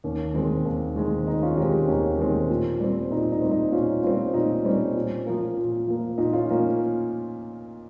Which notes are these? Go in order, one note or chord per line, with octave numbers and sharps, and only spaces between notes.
D#2 C#4
D#3 G#3 C4
D#2
D#3 G#3 C4
D#2 D#4
C#4 F4
D#3 G#3 C4 D#4 G4
D#2 C#4
D#3 G#3 C4
A#2
G3 C4
A#2 D#4
D#4
G3 C4
D#4
A#2 C#4 F4
G3 C4 C#4 F4
A#2 D#4
G3 C4 C#4
A#2
F3 A#3
A#2
F3 A#3
A#2 D#4
C#4 F4
F3 A#3 C#4